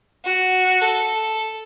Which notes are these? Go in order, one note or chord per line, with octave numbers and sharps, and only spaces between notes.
F#4
A4